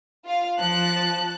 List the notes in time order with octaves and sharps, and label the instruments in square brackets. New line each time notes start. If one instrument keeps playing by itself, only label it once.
[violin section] F4 F5
[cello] F3 [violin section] A5 F#6